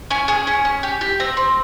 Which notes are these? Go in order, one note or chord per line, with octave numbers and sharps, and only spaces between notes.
C#4 G#5
G#4 G#5
C#4
C#4
G4
G4
C4 A#5
C4